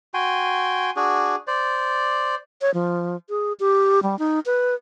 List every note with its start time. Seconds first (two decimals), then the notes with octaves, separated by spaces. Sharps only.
0.14 F#4 G5 G#5 C6
0.96 D4 F#4 G#4
1.47 C5 D5
2.61 C#5
2.74 F3
3.29 G#4
3.60 G4
4.03 G3
4.19 D#4
4.46 B4